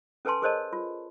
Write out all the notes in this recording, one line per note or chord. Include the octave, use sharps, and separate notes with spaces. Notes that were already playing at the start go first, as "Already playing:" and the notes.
C#4 A4 B4 G#5 A5 C6
G#4 A#4 C5 C#5 D#5 A5
F4